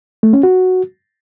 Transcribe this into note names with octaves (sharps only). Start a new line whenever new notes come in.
A3
C#4
F#4